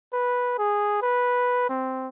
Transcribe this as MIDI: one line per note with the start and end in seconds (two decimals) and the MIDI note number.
0.13 0.57 71
0.58 0.99 68
1.02 1.65 71
1.69 2.08 60